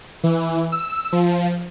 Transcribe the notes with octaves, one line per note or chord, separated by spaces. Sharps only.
E3
E6
F3